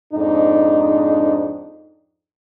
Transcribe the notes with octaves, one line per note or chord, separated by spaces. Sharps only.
F2 G#2 D4 D#4